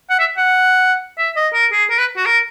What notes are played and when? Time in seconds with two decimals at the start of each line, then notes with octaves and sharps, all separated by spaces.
0.10 F#5
0.19 E5
0.37 F#5
1.18 E5
1.36 D#5
1.54 A#4
1.72 G#4
1.90 A#4
1.99 B4
2.17 F#4
2.26 A#4